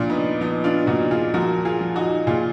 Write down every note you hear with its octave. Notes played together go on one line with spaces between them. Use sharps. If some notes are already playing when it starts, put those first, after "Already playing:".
Already playing: A#2 F3 D4 F4
B3 D#4
F3 B3 D#4
D4 F4
A#2 D#4 F#4
F4 G#4
F3 F#4 A#4
F4 G#4
F3
D#4 F#4
A#2 F4 G#4